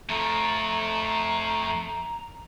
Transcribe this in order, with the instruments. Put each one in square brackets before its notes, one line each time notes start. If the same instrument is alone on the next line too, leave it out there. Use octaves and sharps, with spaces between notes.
[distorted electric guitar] F2 F3 [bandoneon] A3 [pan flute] A#5